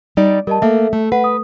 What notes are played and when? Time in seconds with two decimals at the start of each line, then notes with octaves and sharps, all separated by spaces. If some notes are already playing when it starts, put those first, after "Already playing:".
0.17 G3 D#4 D5
0.47 G3 A#4 D#5 A5
0.62 A3 A#3 A4 E5
0.93 A3
1.12 B4 F#5
1.24 D#6